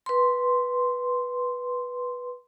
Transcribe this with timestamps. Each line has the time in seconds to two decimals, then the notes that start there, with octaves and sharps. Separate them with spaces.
0.06 B4 C6